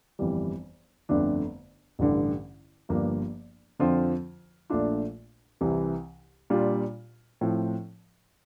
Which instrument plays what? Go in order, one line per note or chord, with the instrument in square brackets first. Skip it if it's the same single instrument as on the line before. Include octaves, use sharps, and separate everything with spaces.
[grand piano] G1 F2 E3 G3
G1 F2 D3 A3 D4
A1 G2 D3
G1 G2 F3 A#3 D4
F2 D3 F3 C4 F4
A#1 A#2 A3 D4 F4
C2 C3 E3
A#2 G3 D4 F4
A2 F3 C4